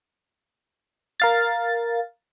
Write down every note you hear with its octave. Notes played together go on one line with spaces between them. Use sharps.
A#4 F5 A6